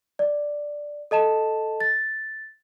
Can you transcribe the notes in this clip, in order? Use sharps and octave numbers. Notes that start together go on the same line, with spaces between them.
D5
A4 D#5 A5 E7
A6